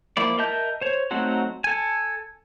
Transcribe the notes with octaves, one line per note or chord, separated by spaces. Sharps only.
F3 A#3 E4 D5
A#4 D#5 E5 A5 G6
C5 C#5
F#3 A3 C4 D#4 F#4
A4 G#5